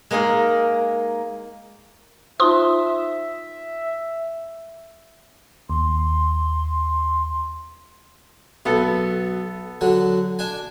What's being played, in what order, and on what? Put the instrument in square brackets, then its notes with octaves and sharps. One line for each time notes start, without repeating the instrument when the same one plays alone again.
[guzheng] G#3 A#3 D#4 G#4 A#4
[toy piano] D#4 F4 C5 [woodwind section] E5 [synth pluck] C6 D#6
[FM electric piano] D#2 [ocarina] C6
[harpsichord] B1 [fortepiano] B3 A4
[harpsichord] D3 F#3
D4 G#5